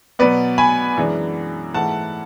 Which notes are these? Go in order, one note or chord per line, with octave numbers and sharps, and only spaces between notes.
B2 F#3 B3 B4 D5
G#5 B5
F#2 E3 G#3 D4
G#2 E3 A3 F#5 A5